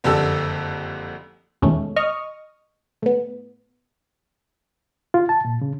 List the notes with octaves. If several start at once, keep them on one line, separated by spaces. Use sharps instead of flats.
F#1 F2 D3 G4 A4 E6
E2 B2 D#3 G#3 A3 C#4
D#5 C#6 D#6 F6
A2 B3
F4
A5
A#2
C#3